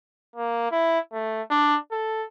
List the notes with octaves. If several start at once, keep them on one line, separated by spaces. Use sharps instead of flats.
A#3
E4
A3
D4
A4